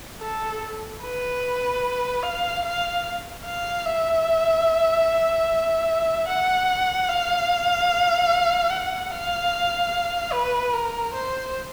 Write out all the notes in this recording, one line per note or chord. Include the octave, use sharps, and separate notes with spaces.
A4
B4
F5
F5
F5
E5
F#5
F5
F#5
F5
B4
A#4
C5